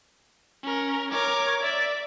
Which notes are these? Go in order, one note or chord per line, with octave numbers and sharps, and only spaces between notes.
C#4 A#4
A#4 C#5 D6
D5 E5